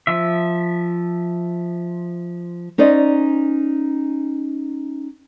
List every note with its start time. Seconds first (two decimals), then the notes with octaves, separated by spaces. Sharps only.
0.07 F3 E5
2.78 C#4 D#4 C5 D5 D#5